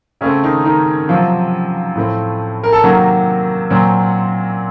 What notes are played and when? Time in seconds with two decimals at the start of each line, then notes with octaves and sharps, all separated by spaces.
0.21 C#3 A3 C4 C#4
0.44 D#3 D#4
0.65 D#3 D#4
1.09 C3 F3 F#3 C4 F4
1.95 A2 A3 C4
2.64 A#4
2.73 A4
2.83 C3 D#3 F#3 A#3 F#4
3.70 A#2 F#3 C4